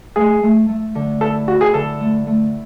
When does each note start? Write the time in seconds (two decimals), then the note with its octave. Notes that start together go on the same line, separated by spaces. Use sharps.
0.16 A3 G#4
0.43 A3
0.68 A3
0.95 D3
1.21 E4 A4
1.48 E4 F#4
1.61 G#4
1.74 D3 A4
2.00 A3
2.27 A3